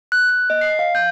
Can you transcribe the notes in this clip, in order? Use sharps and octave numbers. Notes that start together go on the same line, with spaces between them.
F#6
F#6
D#5
C7
F5
G6